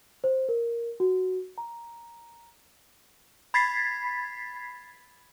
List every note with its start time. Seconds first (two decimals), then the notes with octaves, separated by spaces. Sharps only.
0.24 C5
0.49 A#4
1.00 F#4
1.58 A#5
3.54 B5 G#6 A6 B6 C7